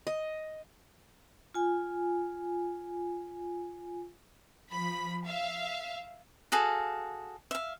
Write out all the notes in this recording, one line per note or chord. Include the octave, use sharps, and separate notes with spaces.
D#5
F4 G#5
F3 B5
E5 F5
F#4 G#4 A4 F5
E5 F5